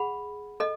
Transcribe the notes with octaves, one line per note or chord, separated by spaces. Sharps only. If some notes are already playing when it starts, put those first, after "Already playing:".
Already playing: G#4 F#5 B5
A4 D#5